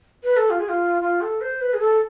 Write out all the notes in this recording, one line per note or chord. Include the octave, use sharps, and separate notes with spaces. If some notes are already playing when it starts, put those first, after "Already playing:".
B4
A4
F4
G#4
F4
F4
A4
C5
B4
G#4
A4